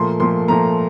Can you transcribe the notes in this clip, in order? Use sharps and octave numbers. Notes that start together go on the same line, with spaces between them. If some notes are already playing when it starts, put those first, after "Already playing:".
Already playing: A#2 F3 A3 C6
A#2 F3 A3 C6
A#2 F3 A3 A#5